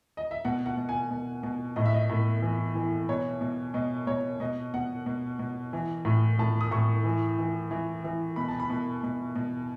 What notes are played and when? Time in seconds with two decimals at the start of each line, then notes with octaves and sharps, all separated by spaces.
0.17 D#5
0.31 E5
0.45 B2 F#5
0.66 F#5
0.77 B2
0.89 G#5
1.11 B2
1.43 B2
1.76 A2 D#5
1.85 E5
1.94 D#5
2.10 A2
2.42 E3
2.75 E3
3.09 B2 C#5
3.41 B2
3.74 B2 D#5
4.07 B2 C#5
4.40 B2 D#5
4.74 B2 F#5
5.06 B2
5.39 B2
5.73 E3
6.05 A2
6.39 A2 A5
6.61 D#6
6.71 A2 C#6
7.05 E3
7.38 E3
7.71 E3
8.04 E3
8.36 B2 B5
8.48 A5
8.60 B5
8.70 B2
9.03 B2
9.36 B2